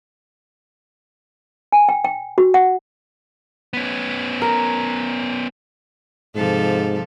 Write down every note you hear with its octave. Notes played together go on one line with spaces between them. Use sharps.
G#5
G5
G5
F#4
F#5
B3 C#4
A#4
G#2 C3 F3 A4